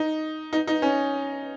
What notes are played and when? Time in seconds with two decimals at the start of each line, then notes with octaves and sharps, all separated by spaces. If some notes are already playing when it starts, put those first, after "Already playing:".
Already playing: D#4
0.53 D#4
0.67 D#4
0.82 C#4